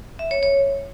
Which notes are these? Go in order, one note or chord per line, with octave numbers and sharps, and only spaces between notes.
E5
C#5
C#5